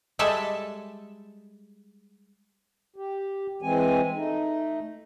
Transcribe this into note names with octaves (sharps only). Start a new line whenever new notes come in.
G3 G#3 A4 E5 A5
G4
E3 G#3 C4 G#5
A3 D#4